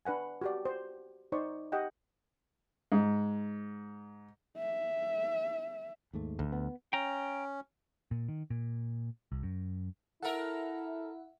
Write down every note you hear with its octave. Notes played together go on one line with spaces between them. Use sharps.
D4 B4 F#5 G#5
F#4 G4 D5
C5
D#4 C5 D5 C#6
G4 D#5 F#5 G5
G#2
E5
D#2 G#2 A3
D2
B3
C#4 G5 A#5
A#2
D#3
A#2
C2
F#2
E4 A4 A#4 E5 F#5